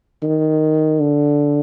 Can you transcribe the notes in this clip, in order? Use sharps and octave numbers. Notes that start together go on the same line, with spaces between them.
D#3
D3